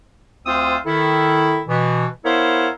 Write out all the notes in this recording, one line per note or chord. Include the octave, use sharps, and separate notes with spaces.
D2 C4 F4 C5 D#6 E6
D#3 E4 A4
B2 E3
B3 E4 A#4 C5 C#5 F5